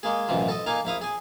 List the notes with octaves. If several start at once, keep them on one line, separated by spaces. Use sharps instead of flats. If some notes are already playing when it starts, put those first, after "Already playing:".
G#3 A#3 G#4
A1 F#2 B2 E3 F3
A4 D#5
A#3 D#4 F5 G#5
A#1 E4 F5 D#6
G#4 G#5